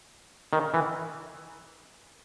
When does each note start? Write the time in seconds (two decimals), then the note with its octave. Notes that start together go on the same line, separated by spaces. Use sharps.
0.53 D#3
0.74 E3